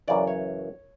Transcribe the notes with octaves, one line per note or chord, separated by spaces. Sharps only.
F#2 C#3 E3 D5
C#5